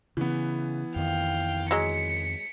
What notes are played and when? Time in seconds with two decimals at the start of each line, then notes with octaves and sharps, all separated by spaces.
0.17 C#3 E3 B3
0.96 F2 D#3 F5 G5
1.71 F#3 G#3 B6 C#7